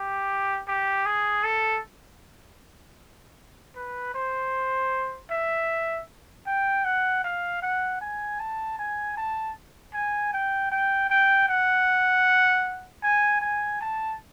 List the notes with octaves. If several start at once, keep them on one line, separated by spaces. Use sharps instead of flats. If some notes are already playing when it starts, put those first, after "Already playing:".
Already playing: G4
G4
G#4
A4
B4
C5
E5
G5
F#5
F5
F#5
G#5
A5
G#5
A5
G#5
G5
G5
G5
F#5
G#5
G#5
A5